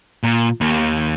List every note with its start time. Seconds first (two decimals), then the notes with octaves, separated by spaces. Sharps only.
0.23 A#2
0.61 D#2